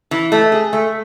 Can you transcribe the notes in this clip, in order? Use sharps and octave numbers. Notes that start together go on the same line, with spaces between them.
E3
A3
G#4
A3